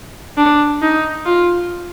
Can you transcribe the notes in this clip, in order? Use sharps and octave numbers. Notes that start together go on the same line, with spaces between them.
D4
D#4
F4